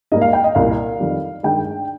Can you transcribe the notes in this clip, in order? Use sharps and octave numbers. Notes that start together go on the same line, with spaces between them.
G#2 G3 A#3 D#5
F5
G5
D#5
C2 A#2 G3 A#3 F5
F2 D#3 G3
G2 D#3 G#3 G5